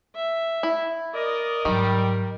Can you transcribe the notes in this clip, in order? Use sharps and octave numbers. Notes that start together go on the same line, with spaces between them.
E5
E4
A#4 D5 D#5
G#2 D#3 F#3 G3